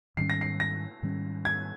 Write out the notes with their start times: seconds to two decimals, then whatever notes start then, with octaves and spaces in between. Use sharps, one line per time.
0.17 G#2 D#3 G3 C#4 C7
0.30 A#6
0.41 C7
0.60 A#6
1.03 G#2 D#3 G3 C#4
1.45 G#6